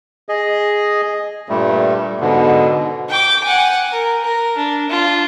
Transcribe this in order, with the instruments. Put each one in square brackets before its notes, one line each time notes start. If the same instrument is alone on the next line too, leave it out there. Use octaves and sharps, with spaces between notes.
[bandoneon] G#4 D#5
G2 A#2 G3 A3
G#2 B2 D3
[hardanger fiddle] G5 D6
F#5 G#5
A#4
A#4
D4
D4 F4